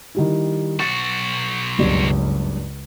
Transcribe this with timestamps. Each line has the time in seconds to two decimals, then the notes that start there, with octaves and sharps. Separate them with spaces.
0.15 D#3 G3 E4
0.80 B1 F#4 A6
1.79 F#1 C#2 G2 D5